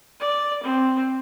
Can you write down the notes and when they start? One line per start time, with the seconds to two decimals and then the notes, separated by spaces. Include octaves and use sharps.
0.20 D5
0.64 C4